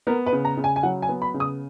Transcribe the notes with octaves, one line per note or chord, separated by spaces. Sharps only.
B3 A#4
B4
C#3
A#5
C#3
G#5
G#5
F#3 F#5
G#5
B3
B5
C#3
D#6